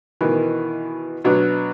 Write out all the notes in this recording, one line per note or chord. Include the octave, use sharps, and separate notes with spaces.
B2 D#3 E3
B2 F#3 B3 D4